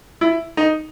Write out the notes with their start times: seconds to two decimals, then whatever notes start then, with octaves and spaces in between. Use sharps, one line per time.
0.21 E4
0.57 D#4